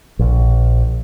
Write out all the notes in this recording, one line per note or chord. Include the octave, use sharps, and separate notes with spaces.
A#1